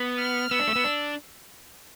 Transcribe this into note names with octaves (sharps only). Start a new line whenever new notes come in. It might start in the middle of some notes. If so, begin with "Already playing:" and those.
Already playing: B3
F6
B3 E6
D4
A3
B3
D4